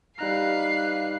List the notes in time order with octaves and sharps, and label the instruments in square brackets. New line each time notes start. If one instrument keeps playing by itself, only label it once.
[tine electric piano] G3 D#4 A#5 [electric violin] B4 F#6 [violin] F5 C7